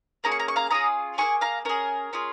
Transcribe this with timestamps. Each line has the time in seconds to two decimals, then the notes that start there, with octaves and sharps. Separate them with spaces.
0.24 A#3 C#4 G#4 A#5
0.32 C#6
0.40 A#5
0.48 C#6
0.56 F5 A#5
0.71 C#4 F4 G#4 A#5 D#6
1.18 A#3 F4 G#4 G#5 C#6
1.41 F5 A#5
1.65 C#4 G#4 A#4
2.13 C#4 F4 G#4